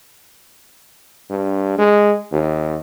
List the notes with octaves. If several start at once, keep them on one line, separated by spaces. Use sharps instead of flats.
G2
G#3
D#2